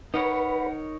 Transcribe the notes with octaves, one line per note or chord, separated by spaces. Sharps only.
D#4 A#4 B4 C#5 F#5